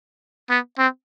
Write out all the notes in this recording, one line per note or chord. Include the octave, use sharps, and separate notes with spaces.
B3
C4